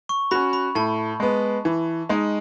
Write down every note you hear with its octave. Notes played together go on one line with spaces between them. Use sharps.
C#6
C#4 F#4 B5
B5
A2 A5
G#3 B3
E3
G#3 D#4